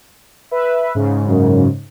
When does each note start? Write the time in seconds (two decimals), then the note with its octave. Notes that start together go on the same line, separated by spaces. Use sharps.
0.51 B4 E5
0.95 G#2 C#3
1.27 F#2